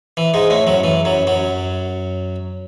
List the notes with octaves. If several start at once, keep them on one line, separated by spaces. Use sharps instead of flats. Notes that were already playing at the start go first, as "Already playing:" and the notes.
E3
G#2 G#3
A2 A3
F#2 F#3
E3
F#2 F#3
F#2 F#3